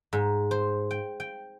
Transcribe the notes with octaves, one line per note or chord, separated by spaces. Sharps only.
G#2
C5
G5
G5